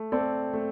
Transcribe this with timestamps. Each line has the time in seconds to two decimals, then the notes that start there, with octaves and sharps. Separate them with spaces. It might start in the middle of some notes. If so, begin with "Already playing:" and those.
Already playing: A3
0.12 C4 A4 D5
0.53 A3